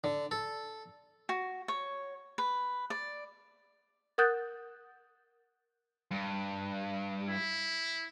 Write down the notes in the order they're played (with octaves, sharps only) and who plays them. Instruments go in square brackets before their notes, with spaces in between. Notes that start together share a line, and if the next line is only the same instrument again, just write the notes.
[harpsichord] D3
A4
[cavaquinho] F#4
C#5
B4
D5
[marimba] A#4 F#5 D#6 F#6 G6 A6
[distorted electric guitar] G2
[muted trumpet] E4